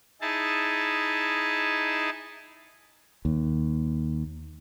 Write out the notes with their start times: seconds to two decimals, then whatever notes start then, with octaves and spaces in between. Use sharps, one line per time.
0.21 D#4 E4 G#4 A5
3.25 D#2